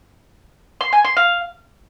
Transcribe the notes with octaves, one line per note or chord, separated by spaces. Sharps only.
C6
G#5
C6
F5